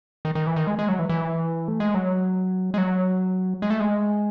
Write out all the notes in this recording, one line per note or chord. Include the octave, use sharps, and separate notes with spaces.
D#3
D#3
E3
D#3
G#3
G#3
F#3
E3
E3
A3
G#3
F#3
G#3
F#3
G#3
A3
G#3